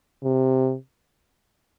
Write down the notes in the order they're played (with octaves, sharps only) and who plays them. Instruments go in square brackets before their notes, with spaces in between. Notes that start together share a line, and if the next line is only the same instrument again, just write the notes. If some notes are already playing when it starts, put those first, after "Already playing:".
[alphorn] C3